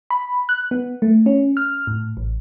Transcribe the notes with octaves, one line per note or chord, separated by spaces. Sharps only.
B5
F#6
B3
A3
C#4
F6
A2
A1